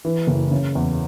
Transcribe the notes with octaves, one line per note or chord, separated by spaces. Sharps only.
E3
F#1
C#3
E2